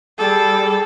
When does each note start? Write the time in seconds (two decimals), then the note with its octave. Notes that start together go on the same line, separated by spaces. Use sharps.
0.18 G3 G#4 A4